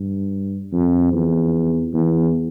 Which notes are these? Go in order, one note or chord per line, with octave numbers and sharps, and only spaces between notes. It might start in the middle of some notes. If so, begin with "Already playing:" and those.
Already playing: G2
F2
E2
E2